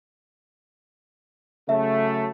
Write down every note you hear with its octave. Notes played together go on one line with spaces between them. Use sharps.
C#3 F#3 A3 E5